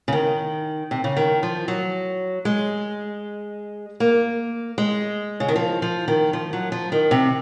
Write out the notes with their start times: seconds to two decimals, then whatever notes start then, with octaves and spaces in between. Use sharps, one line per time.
0.08 C#3
0.12 D#3
0.91 C3
1.04 C#3
1.16 D#3
1.43 F3
1.68 F#3
2.45 G#3
4.00 A#3
4.78 G#3
5.40 C#3
5.48 D#3
5.56 F3
5.82 F3
6.08 D#3
6.33 F3
6.53 F#3
6.72 F3
6.92 D#3
7.11 C3